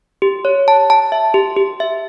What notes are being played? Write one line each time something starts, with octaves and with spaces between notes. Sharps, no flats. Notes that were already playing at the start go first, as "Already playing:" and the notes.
G4
C#5
A5
A5
E5
G4
G4
E5